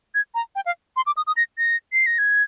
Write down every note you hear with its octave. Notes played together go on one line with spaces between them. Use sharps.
G#6
A#5
G5
F5
C6
D6
D#6
D#6
A#6
A#6
C7
A#6
G#6